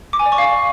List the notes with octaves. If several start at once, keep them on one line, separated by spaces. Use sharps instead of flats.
D6
G#5
D5
C#6
F5